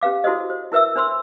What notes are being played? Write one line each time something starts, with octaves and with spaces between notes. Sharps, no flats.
C#4 G4 B4 F5 D6
E4 F#4 A4 C5 D#5
C5
E4 A#4 B4 E5 E6
D4 C5 B5 C6 E6